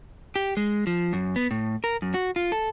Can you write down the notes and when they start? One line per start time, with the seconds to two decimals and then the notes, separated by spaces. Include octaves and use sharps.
0.36 G4
0.57 G#3
0.87 F3
1.13 F#2
1.36 B3
1.51 A2
1.84 A#4
2.02 F#2
2.14 F#4
2.36 F4
2.52 A4